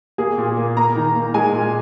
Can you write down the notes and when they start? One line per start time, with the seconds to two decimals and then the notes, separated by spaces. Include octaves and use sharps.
0.18 A#3 G#4
0.38 A#2
0.57 A#3
0.77 A#3 A#5
0.96 D#3
1.15 A#3
1.34 G#3 G#5
1.53 A#2